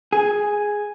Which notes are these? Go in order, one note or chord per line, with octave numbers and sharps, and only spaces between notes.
G#4